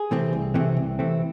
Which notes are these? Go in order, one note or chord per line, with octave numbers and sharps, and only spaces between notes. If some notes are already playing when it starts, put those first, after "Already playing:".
Already playing: G#4
C3 E3 A3 C4
C2
C3 E3 A3 C4
C2
C3 E3 A3 C4